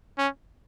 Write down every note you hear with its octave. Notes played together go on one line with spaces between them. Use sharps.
C#4